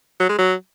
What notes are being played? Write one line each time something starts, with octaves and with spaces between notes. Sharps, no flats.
F#3
G#3
F#3